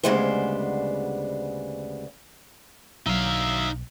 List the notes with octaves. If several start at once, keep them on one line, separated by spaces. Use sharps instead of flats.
D2 C#3 G3 G#3 B3 C5
B1 F#3 D4 D#4 E5 F5